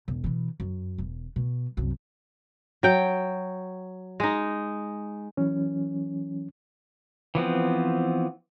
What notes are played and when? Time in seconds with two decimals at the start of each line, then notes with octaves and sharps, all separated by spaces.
0.08 E1
0.24 B2 E3
0.60 F#2
0.98 E1
1.36 B2
1.77 C2 F#2
2.83 F#3 G5
4.20 G#3 D#4
5.37 E3 F#3 C#4
7.35 E3 F3 B3 C4